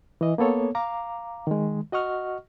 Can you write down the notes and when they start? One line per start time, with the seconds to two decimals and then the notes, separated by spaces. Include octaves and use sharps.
0.21 E3 D#5
0.38 A#3 B3 A4 C#5
0.75 F5 A#5 D6
1.47 D#3 G#3
1.92 F#4 D#5 F#5 C#6 F6